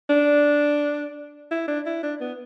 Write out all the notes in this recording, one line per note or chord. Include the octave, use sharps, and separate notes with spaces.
D4
E4
D4
E4
D4
B3